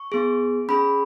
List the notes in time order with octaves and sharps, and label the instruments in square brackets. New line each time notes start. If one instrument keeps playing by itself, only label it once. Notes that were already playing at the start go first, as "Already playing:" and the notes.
Already playing: [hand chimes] C#6
B3 G#4
C#4 G#4 B5